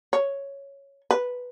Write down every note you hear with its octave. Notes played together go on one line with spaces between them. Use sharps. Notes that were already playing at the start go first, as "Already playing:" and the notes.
C#5
B4